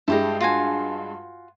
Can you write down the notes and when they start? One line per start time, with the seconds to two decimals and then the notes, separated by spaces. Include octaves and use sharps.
0.08 G2 G#3 E4 G4 D#5
0.41 F4 F#4 G#5